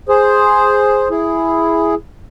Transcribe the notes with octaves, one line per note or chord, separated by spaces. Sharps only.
G#4 C5
E4 G#4